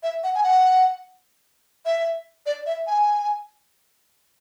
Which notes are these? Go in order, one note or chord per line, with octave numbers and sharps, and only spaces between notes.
E5
F#5
G#5
F#5
E5
D5
E5
G#5